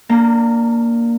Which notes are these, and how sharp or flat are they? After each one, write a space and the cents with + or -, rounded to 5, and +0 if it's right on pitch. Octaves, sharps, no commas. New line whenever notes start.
A#3 +0 D4 +0 A#5 -25